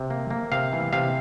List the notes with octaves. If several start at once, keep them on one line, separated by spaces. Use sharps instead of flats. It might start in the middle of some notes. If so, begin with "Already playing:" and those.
Already playing: C3
A#3
A#3
C3 F5
E3
C3 F5